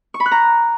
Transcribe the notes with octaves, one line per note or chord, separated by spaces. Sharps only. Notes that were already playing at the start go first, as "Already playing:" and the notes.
C#6
B5
F#6
A#5